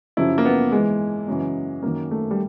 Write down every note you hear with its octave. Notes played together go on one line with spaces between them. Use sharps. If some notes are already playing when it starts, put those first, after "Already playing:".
F#2 C#3 F3 E4
A#3
B3
G#2 E3 G#3
F#2 C#3 E3
F#2 D#3 A#3
A3
G3